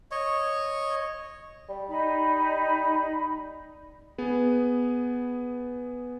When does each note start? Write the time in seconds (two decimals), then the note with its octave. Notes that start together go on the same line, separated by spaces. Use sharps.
0.11 C#5 D#5 C#6
1.69 G3
1.88 D#4 B5
4.18 B3 G#4